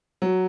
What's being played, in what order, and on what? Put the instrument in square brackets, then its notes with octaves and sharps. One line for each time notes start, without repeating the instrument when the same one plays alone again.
[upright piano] F#3